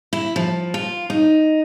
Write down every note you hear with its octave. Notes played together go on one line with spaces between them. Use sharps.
E4
F3
F4
D#4